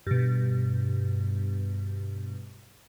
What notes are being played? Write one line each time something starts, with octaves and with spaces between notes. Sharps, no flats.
G2 B2